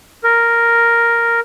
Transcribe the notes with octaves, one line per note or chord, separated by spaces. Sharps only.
A#4